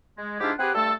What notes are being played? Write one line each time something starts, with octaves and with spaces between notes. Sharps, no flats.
G#3
G#2 D4 E4 F4 G4
C4 G4 G#4 B4 F#5
G2 A3 A4